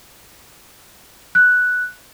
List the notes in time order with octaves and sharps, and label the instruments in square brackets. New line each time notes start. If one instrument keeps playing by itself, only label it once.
[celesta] F#6